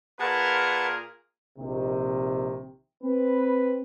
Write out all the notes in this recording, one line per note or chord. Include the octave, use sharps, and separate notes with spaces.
A#2 G#4 A#4 B4 F#5 A5
A#1 C3 D#3
C4 B4